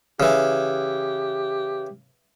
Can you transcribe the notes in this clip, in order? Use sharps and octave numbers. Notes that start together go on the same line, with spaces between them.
C#3 E3 G4